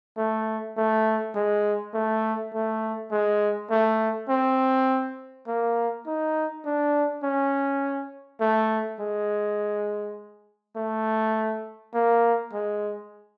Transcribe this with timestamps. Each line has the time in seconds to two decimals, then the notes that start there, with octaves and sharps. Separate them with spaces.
0.17 A3
0.77 A3
1.35 G#3
1.94 A3
2.54 A3
3.12 G#3
3.70 A3
4.29 C4
5.48 A#3
6.06 D#4
6.65 D4
7.23 C#4
8.40 A3
9.00 G#3
10.76 A3
11.94 A#3
12.53 G#3